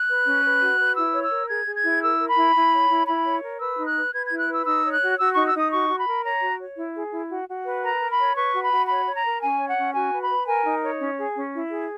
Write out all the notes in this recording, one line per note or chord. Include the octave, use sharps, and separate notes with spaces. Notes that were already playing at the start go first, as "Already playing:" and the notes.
Already playing: F#6
B4
C#4
B4
F#4
B4
E4 E6
C#5
E6
A#4
G#4 G#6
G#4
G#6
E4
A#4 E6
A#4
B5
E4
E4
C#5
E4
E4 B5
C#5
A#4
B4 E6
D#4
F#6
B4
B4 G#6
E4 G#6
F#6
B4 E6
D#4 E6
C#5
F#6
F#4
F#4 E6
D#4 C#6
E6
D#4 D#6
F#4 C#6
F#4
B5
A#4
C#5 A#5
F#4
C#5
E4
G#4
E4
F#4
F#4
B4
A#4 A#5
A#4
B5
C#5
B4 C#6
F#4
B5
F#4
C#5 B5
C#5
A#5
A#4
C#4 G#5
C#5
F#5
C#4
F#4 G#5
B4
B5
B4
A#4 G#5
D#4
C#5
C#4
G#4
C#4
E4
G#4